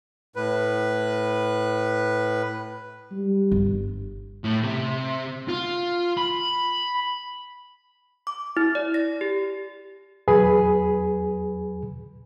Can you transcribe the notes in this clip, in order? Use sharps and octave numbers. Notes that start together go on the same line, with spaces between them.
A2 B4
G3
G1
A2
C3
F4
B5
D6
E4
D5
A#6
G4
E2 F#3 G#4 B4 G#5 B5